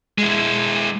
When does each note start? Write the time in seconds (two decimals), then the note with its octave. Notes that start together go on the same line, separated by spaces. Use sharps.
0.18 G#3 E4